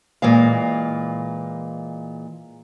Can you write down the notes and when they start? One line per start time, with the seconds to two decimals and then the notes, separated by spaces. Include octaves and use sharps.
0.22 A#2 E3 G#3 F5